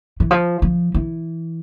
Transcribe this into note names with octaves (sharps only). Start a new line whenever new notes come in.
E3
F3
F3
E3